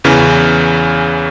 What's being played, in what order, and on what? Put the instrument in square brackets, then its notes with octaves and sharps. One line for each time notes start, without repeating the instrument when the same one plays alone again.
[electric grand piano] E2 C#3 E3 C#4